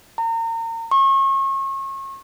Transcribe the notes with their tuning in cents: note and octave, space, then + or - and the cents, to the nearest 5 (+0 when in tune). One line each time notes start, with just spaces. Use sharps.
A#5 -35
C#6 -35